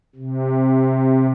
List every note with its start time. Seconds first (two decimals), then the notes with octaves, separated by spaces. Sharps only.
0.16 C3